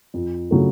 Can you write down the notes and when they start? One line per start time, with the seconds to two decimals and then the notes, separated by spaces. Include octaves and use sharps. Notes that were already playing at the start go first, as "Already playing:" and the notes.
0.14 F2
0.51 C#3 F#3 A3